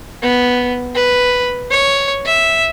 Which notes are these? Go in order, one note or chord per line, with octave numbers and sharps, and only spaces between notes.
B3
B4
C#5
E5